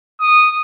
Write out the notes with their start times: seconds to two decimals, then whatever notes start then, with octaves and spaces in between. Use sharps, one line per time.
0.21 D#6